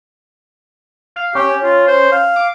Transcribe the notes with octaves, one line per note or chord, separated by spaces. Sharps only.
F5
C#4 G4
F4
C5
F5
D6